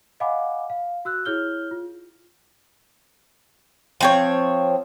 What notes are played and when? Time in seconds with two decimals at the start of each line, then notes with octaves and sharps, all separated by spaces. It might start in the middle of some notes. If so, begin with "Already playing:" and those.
0.20 D#5 F5 F#5 G#5 B5 D6
0.70 F5
1.05 F#4 E6 F#6
1.26 E4 G#4 C#5 F6 G6 G7
1.71 F4
4.01 F3 C4 C#5